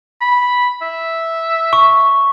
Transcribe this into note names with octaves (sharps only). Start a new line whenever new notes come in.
B5
E5
C#6